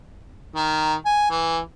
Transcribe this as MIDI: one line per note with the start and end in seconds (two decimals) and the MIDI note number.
0.55 0.95 51
1.05 1.30 80
1.30 1.59 52